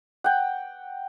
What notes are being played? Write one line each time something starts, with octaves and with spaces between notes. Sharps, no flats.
F#5 G5